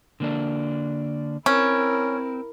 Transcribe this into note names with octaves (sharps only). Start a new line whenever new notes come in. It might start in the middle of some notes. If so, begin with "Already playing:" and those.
D3 A#3 D4
C4 C#4 E4 A#4